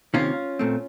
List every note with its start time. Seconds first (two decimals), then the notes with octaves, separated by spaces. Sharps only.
0.14 C3 D#3 A#3 C#4 F4
0.59 A#2 A3 C4